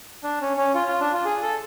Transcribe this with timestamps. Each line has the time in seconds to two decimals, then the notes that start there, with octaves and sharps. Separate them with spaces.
0.23 D4
0.41 C#4
0.57 C#4
0.75 F4
0.88 F4
1.00 D4
1.13 F4
1.25 G#4
1.42 A4